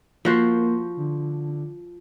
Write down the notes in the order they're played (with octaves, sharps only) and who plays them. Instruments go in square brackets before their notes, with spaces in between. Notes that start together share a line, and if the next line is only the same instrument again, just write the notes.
[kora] F3 F#4 C5 [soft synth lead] A#3
[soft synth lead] D3